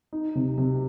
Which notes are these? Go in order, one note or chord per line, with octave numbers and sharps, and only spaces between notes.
D#4
C3
C3